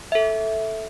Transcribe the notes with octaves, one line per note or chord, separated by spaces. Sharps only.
A4 E5